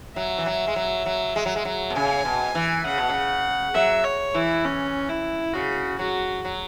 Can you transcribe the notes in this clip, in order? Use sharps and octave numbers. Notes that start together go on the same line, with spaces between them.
F#3 E5
E3
F#3
G#3
F#3
F#3
G#3
F#3
G#3
F#3
B2
C#3 G#5
B2
E3
C#3 F#5
B2
C#3
F#3 E5
C#5
E3 E4
C#4
E4
C#3 F#4
F#3 F#4
F#3